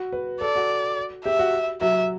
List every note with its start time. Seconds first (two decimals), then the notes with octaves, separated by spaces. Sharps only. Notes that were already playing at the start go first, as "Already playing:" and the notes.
Already playing: F#4
0.12 B4
0.40 A4 D5
0.56 F#4
1.25 G4 E5
1.39 F#4
1.81 F#3 E5